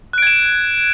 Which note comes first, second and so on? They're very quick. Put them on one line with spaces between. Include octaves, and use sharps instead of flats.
F#6 D7 G#6 E7